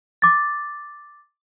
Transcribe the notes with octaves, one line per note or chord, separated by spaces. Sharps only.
D6 A6